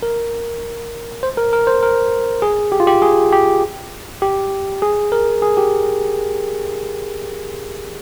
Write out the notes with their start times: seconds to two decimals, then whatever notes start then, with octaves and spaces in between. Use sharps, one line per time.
0.03 A#4
1.23 C5
1.37 A#4
1.53 A#4
1.67 C5
1.83 A#4
2.42 G#4
2.72 G4
2.80 F4
2.87 G4
3.02 G#4
3.32 G4
4.22 G4
4.82 G#4
5.12 A#4
5.42 G#4
5.57 G4